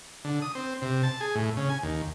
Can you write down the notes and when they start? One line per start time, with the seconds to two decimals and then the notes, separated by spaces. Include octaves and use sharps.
0.25 D3
0.42 D#6
0.55 C4
0.82 C3
1.03 A5
1.21 G#4
1.35 A2
1.57 C#3
1.69 G#5
1.83 D#2